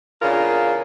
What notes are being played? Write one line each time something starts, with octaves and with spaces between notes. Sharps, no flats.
E2 C#3 D4 F4 A#4